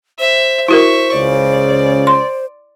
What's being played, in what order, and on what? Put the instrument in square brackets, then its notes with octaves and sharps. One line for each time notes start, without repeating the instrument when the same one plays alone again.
[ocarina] C5 [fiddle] E5
[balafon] E4 F#4 A#4 [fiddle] E5 C#6
[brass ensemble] C#2 C#3 [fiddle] D5
[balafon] C6